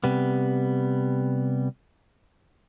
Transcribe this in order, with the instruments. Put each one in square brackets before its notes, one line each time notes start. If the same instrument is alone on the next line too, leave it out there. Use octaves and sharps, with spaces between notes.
[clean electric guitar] C3 G3 B3